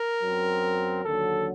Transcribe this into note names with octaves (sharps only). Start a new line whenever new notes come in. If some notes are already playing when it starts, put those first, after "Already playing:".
Already playing: A#4
F#2 F#3 C4
D#2 D3 F#3 A4